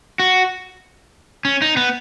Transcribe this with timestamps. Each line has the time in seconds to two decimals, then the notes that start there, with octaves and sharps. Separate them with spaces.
0.20 F#4
1.45 C#4
1.62 D#4
1.77 B3